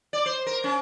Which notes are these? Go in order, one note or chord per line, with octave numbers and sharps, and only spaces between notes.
D5
C5
A#4
C#4